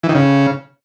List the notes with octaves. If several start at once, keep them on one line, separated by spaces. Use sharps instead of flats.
E3
D#3
C#3